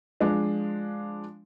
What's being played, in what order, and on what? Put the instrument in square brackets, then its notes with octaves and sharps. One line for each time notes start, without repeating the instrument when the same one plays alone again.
[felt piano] F3 G#3 D4